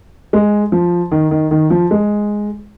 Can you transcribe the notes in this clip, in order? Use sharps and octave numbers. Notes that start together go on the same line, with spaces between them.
G#3
F3
D#3
D#3
D#3
F3
G#3